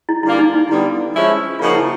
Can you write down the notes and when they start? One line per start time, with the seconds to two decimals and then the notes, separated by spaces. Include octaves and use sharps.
0.09 E4
0.23 D3 G3 A#3 E4
0.39 D#4
0.54 D#4
0.69 D3 G3 B3 E4
1.15 F3 G#3 C#4 E4
1.59 C#3 F3 A#3 D#4 F4 F#4
1.75 E4